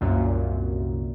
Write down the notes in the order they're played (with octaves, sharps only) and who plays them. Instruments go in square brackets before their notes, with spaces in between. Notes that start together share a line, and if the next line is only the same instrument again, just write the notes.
[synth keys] C2 F#2 A#2